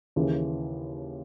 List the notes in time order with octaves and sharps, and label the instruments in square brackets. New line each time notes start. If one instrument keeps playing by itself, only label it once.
[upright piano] D#2 C#3 E3